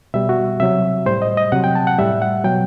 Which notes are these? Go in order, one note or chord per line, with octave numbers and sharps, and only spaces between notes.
B2 G3 E5
F#4
C3 F#3 E5
A2 G3 C5
D#5
D#5
C3 F#3 F#5
G5
A5
F#5
A2 G3 E5
F#5
B2 F#3 G5